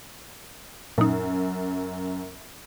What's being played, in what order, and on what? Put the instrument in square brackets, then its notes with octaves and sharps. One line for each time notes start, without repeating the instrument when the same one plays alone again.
[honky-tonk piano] F#2 [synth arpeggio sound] A#2 D#4